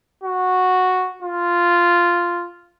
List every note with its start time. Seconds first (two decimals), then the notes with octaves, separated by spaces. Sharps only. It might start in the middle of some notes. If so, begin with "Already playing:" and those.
0.24 F#4
1.22 F4